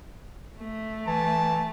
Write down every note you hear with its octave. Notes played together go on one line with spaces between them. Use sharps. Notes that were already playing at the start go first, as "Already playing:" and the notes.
A3
E3 A5